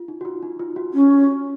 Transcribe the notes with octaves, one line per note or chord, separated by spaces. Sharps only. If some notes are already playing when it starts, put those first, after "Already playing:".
Already playing: F4
D#4
F#4
F4
D#4
F4
F#4
C#4